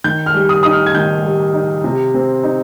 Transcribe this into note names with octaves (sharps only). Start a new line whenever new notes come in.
D#3 G6
F6
G3
D#6
D#4 D#6
F6
G#6
D#3 G6
G3
D#4
C3
C4
D#4